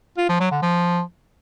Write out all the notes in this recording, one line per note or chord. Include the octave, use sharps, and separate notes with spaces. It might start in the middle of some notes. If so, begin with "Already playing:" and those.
F4
F3
F#3
D3
F3